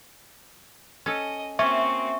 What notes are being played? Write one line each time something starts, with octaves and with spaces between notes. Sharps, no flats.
C#4 A4 D#5
A#3 C4 C#4 F#4 E5 C#6